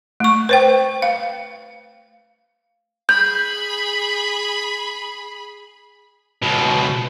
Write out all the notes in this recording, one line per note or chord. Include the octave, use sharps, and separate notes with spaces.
A3 C#6
B4 C5 G5
F5
G#4 B5 G6
C#2 B2